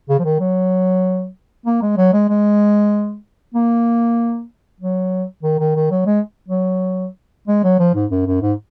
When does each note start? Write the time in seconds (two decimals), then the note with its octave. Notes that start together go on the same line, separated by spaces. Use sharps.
0.09 C#3
0.19 F3
0.24 D#3
0.40 F#3
1.66 A#3
1.82 G#3
1.98 F#3
2.13 G#3
2.29 G#3
3.55 A#3
4.80 F#3
5.43 D#3
5.59 D#3
5.75 D#3
5.91 F#3
6.06 G#3
6.48 F#3
7.48 G#3
7.64 F#3
7.79 F3
7.95 G#2
8.11 F#2
8.26 F#2
8.42 G#2